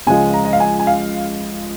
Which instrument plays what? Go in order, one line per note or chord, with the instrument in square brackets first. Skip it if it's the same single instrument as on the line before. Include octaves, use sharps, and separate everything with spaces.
[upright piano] C#2 C#3 F3 G#3 F4 [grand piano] G#5
[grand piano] A#5
D#5
F5
G#5
G#5
F5